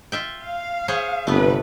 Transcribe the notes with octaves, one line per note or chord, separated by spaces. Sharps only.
F4 E5 G5
F5
G#4 C5 C#5
G1 C3 A3 B3 B4